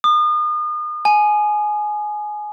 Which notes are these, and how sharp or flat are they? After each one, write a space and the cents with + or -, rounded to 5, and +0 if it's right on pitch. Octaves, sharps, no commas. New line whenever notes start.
D#6 -35
G#5 +20